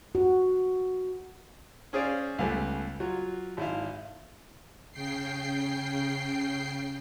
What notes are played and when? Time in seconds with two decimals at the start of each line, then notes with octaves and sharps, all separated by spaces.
0.15 F#4
1.93 C#4 G#4 C5 D5 F5
2.38 C#2 G3 A3 B3 G#5
3.00 F#3 F4
3.57 G#1 E4 F5
4.92 C#3 G5 C7